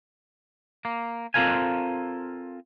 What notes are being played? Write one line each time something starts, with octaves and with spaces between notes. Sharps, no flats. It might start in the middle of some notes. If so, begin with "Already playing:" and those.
A#3
C4 F4 A4 A#4 F5 G#5